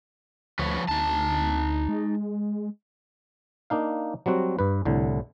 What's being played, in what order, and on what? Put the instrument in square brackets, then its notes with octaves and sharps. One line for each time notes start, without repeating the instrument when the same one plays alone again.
[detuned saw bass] D2 [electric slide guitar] F3 B4 C#5
[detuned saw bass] D2 [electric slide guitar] D#4 A5
[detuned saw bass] G#3
[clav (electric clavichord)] A#3 D4 D#4 F5
F#3 G3 C4 F#4
G2 B4
C2 A2 D3